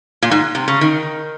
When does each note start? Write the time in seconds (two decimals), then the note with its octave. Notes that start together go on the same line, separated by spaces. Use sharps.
0.22 A#2
0.31 G#2
0.55 C3
0.68 C#3
0.81 D#3